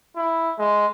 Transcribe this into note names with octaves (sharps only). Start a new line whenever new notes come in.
E4
G#3